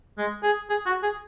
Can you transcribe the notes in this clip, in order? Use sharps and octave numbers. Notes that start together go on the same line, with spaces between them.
G#3
G#4
G#4
F#4
G#4